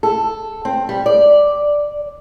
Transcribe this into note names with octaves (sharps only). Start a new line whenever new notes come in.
A4
C4
G3
D5